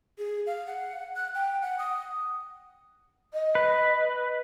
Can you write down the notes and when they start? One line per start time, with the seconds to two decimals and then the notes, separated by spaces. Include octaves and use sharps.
0.18 G#4
0.46 F5
0.67 F#5
1.16 F#6
1.35 G5
1.62 F#5
1.79 D#6
3.34 D#5
3.55 B4